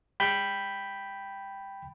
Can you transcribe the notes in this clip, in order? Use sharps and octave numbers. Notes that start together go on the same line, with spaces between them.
G5 B5 G6